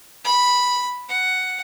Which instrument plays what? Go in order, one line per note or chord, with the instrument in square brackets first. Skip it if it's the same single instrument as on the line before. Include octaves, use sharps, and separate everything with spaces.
[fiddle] B5
F#5